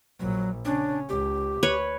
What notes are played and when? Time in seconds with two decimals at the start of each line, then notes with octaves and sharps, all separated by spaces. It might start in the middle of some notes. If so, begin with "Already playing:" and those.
0.20 A#1 F#3
0.65 C#3 C#4 D4
1.09 C#2 G4
1.63 D2 B4 C#5